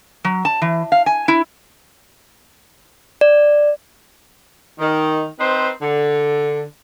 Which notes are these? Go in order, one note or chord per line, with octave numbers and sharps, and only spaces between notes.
F#3
A5
E3
F5
G#5
E4
D5
D#3
C4 D#4 B4 C5
D3